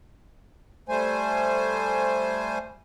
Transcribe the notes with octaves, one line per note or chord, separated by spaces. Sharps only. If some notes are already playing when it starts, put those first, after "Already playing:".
G3 A3 C5 G#5